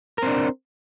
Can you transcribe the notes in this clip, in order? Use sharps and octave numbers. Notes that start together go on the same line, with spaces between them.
C4 D4 A#4